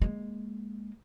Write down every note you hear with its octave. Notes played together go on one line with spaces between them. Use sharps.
G#3 A#3